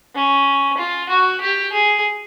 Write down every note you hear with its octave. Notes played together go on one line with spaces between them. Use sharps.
C#4
F4
F#4
G4
G#4